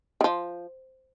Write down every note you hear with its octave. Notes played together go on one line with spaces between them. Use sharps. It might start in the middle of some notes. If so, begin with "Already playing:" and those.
D#3
F3